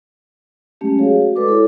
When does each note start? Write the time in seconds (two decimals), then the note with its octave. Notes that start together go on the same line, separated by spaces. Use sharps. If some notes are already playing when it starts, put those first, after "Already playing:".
0.81 F#3 G#3 A3 C#4 G4
0.99 F#4 G#4 C#5 F5
1.22 F#4
1.36 G#3 A4 B4 D5 D6
1.48 E4 A4 C#5